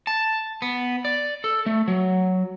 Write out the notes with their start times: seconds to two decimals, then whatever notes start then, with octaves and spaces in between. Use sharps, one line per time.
0.07 A5
0.62 B3
1.05 D5
1.44 A4
1.66 A3
1.88 F#3